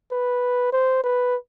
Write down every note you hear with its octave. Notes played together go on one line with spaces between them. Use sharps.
B4
C5
B4